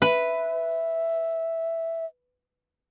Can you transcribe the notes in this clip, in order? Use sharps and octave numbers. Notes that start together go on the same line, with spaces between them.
B4 E5